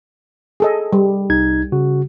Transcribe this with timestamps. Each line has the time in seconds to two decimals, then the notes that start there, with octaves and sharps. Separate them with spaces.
0.60 G#4 A4 D#5
0.93 G3
1.30 C2 D#4 G#6
1.72 C#3 F#4